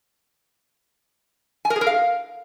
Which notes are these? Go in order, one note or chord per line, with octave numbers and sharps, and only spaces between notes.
G#5
A#4
G#4
A#4
F5